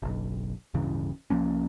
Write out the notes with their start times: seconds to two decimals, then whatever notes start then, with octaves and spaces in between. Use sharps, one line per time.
0.02 F#1 B1
0.74 D1 G2 C#3 E3
1.30 C2 F3 A#3 C#4